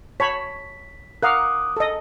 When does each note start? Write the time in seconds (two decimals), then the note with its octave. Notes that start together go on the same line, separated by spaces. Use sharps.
0.20 C#5 A5 B5 B6
1.23 A#4 F5 F#5 D6 D#6 F#6
1.77 A4 D#5